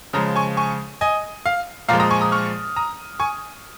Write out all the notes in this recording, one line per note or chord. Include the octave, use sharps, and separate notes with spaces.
C#3 F3 G#3 A#5 D#6
G#5 C#6
G#5 C#6
D#5 G#5
F5
A#2 F3 G#3 F5 A#5
A#5 D#6
G#5 C#6
A#5 D#6
C#6 F6
A#5 D#6
G#5 C#6